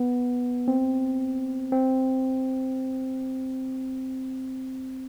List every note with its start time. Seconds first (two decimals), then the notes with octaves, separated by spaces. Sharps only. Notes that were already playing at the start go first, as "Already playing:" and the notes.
Already playing: B3
0.68 C4
1.72 C4